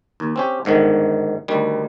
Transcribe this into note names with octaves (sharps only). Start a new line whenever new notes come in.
D#2
C4 C#4 G4
G1 G#2 D3 D#3
D2 D#3 G3